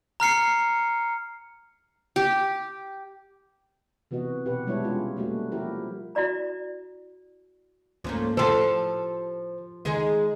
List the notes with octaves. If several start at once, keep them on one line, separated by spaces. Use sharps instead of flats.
A#5 F6 C7 C#7
G4
C3 E3 B3 F#4 D#5
B2 G4 B4 F#5
G3 G#3 D4 E4 C#5
G#3 C#4 F4 G4
G3 A3 A#3 F#4
F3 E4 G4 A#4
E4 F#4 D5 A#5
G#2 F3 A3 A#3 C#4
A2 F3 G4 A4 C5
D#3 G#3 D#4 G#4